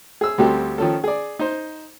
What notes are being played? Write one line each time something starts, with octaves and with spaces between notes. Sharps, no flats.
G#4 E6
D2 G3 C4 F#4 G4 A4
D#3 F3 C#4 A4
G#4 D5
D#4 C5